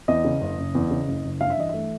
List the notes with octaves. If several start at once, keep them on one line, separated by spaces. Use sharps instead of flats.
E2 D#5
C#3
F#1
F#1
E2
C#3
F#1
F#1
G2 F5
E5
E3 D#5
A3 E5